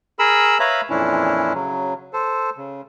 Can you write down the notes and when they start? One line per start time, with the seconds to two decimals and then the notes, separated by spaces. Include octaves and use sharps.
0.19 G#4 A#4 B5 E6
0.60 B4 C#5 E5 F5 A#5 B5
0.90 F2 A#2 E3 C#4 D4 E4
1.54 C#3 F#3
2.13 A4 C5
2.57 C#3